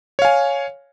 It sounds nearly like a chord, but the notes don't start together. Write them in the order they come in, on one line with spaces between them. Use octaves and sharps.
C#5 F5 G#5